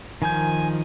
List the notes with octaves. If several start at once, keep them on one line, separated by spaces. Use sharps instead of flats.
D#3 F3 G#5 G6